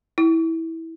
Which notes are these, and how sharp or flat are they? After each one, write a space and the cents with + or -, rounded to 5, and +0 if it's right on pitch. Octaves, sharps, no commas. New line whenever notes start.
E4 -15